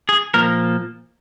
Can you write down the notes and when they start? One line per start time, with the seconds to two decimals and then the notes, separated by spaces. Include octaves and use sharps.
0.09 G#4
0.34 A#2 F3 A#3 A#4